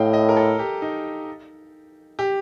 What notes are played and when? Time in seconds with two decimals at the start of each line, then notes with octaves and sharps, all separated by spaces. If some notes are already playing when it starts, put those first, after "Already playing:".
Already playing: A2 D#5 F5 G5
0.13 D#5
0.29 A#4
0.37 A4
0.59 G4
0.82 D#4
2.19 G4